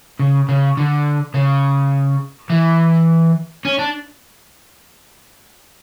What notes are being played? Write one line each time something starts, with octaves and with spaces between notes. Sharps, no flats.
C#3
C#3
D3
C#3
E3
C#4
D4